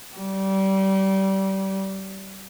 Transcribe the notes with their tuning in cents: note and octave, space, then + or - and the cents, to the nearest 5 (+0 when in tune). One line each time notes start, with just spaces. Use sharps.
G3 -25